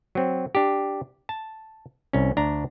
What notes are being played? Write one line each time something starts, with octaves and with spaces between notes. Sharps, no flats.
F#3 C4
D4 G4
A5
C2 C#4
D2 D4 A#5